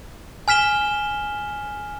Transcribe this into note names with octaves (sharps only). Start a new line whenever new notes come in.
G#5 F6 B6 E7 G7